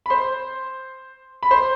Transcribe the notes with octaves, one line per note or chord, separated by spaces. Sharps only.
B5
C5 C6
B5
C5 C6